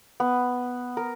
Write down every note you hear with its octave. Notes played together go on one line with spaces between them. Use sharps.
B3
A#4